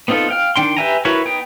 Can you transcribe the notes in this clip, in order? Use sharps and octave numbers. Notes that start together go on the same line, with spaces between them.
B3 C4 D#4 F4 A4
F5 G5 F6
D#3 D4 G5 C6
G4 B4 E5 G#5 A#5
E4 F#4 A#4 B4 C#5
B3 D#4 G5